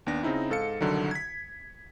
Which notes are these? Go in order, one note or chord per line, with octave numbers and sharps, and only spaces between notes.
D#2 B3 D4 A#6
C#3 C4 D#4 E4
G#2 A4 F5 C#7
C2 D3 D#3 F#3
G#6 B6